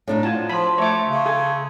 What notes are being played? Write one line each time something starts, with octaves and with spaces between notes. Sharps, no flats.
A2 D4 D#4
F4 F#4 G#5 A5
F3 A5 B5 C6
A3 C#5 D6
C#3
G#4 A4 G#5